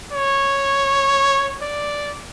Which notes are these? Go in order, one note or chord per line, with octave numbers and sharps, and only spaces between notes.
C#5
D5